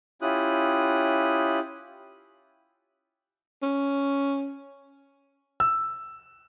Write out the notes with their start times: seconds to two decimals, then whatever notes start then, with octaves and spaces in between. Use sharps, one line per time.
0.22 C#4 E4 F4 G4 D#6 F#6
3.63 C#4
5.60 E6